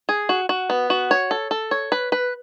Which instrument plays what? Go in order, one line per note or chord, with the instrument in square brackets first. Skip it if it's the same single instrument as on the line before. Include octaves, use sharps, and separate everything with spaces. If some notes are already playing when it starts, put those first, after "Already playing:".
[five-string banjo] G#4
F#4
F#4
B3
F#4
C#5
A4
A4
C#5
B4
B4